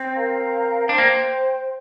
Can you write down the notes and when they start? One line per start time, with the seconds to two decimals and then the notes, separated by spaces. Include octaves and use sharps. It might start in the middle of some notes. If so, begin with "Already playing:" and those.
Already playing: C4
0.15 A#4 F5 A#5
0.89 D4 C5 G5 C6
0.98 A#3